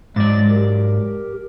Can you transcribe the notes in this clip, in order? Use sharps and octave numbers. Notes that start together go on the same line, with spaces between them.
G#2 F#3 G#3 D5 D6 A6
G4 A#4